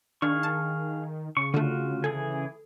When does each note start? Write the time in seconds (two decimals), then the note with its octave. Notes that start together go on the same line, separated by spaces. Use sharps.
0.22 D#3 D4 G#4 F5 C#6
0.43 A5
1.37 C#3 C#6
1.54 D3 A3 F4 F#4
2.04 E3 G#4 A4 G#5